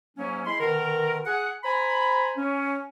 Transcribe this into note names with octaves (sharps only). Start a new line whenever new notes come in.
G#2 F#3 A#3 C#4
G#3 E4 B5 C6
B2 D3 D#3 A#4
G#4 F#5
C5 G#5 A#5 B5
C#4